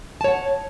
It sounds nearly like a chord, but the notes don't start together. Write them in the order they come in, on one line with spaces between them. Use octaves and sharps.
A5 C#5 F#5